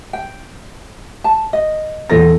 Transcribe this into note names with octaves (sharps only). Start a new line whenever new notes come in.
G5
A5
D#5
E2 A4 A#6